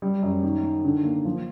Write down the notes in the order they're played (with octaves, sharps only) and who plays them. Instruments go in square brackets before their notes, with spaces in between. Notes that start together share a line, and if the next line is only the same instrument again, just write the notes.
[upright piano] G3
F#2
D#3
D#3
D3
A#3
F3